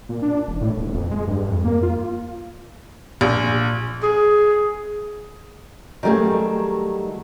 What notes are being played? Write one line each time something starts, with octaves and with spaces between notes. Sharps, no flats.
A#2
D4
E1
A2
D#1
F2
G#3
G2
F2
A#3
F4
A#1
G#4
D#3 F#3 G3 A3 G#4